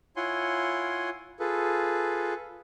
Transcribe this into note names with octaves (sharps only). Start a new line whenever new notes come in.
E4 F4 C#5 F#5 G#5 C6
F4 G#4 A4 B4